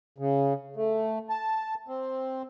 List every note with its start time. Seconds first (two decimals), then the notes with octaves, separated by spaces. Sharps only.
0.18 C#3
0.76 A3
1.30 A5
1.88 C4